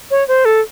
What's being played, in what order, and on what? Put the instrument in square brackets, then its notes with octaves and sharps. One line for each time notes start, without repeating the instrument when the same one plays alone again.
[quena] C#5
C5
A4